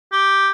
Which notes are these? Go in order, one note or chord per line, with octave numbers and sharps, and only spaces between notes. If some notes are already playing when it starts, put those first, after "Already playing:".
G4